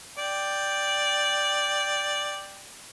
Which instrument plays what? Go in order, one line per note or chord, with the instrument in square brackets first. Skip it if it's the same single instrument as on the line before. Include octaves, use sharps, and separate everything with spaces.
[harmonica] D5 G5